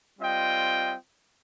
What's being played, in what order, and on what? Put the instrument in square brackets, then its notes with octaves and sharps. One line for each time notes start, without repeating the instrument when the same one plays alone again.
[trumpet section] G3 C4 F4 D#5 G5